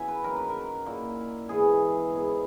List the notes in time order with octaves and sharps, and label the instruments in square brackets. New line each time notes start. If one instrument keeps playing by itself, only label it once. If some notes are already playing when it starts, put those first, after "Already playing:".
Already playing: [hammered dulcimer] F#2 E3 B3 C#4 E5 F#5 G#5
B4
F#2 D#3 F#3 A#4
B4
A#4
A#2 A#3 E4
G#2 E3 B3 G#4
G#2 F#3 B3